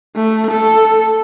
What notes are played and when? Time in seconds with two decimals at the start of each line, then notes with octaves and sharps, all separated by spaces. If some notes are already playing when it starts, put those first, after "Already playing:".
0.16 A3
0.50 A4